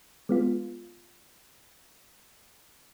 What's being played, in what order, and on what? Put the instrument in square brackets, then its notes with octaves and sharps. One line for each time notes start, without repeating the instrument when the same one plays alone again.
[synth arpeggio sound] G#3 B3 F4